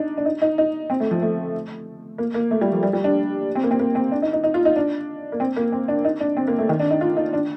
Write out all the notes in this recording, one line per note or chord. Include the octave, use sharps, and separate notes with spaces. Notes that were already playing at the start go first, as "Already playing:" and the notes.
Already playing: D4 D#4
D4
D#4
D#4
D#4
C4
A3
F3
A3
A#3
A#3
A3
G3
F3
G3
G3
D4
C4
A#3
C4
A#3
C4
D4
D#4
D#4
D#4
F4
D#4
D4
A#3
C4
A#3
C4
D4
D#4
D4
C4
A#3
A3
D#3
D4
D#4
F4
D#4
D4